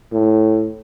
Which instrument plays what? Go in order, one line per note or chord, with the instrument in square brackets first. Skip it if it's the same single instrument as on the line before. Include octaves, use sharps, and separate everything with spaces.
[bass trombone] A2